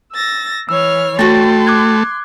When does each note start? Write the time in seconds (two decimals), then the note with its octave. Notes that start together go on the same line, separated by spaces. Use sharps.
0.13 E6 A6 A#6
0.69 E3 C#5 E6 F6
1.19 A3 F#4 G5 C6 A6
1.67 D6 F#6 G#6